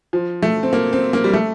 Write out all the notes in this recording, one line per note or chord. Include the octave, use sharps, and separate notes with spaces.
F3
A3
C4
A#3
C4
A#3
G3
A3